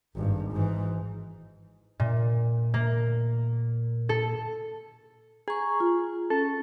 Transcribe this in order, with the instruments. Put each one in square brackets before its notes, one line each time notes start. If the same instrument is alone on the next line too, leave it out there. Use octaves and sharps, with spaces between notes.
[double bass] G#1 G2
G#2 E3
[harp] A#2
A#3
A4
[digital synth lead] G#4 [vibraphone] A#5 C#6
[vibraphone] F4
[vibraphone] C#4 [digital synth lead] A4